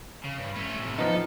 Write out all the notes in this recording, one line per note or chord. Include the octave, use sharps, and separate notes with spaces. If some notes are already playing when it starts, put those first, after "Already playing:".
C#3
G2
A3 C#4
A2 C3
F3 B3 D#4 A4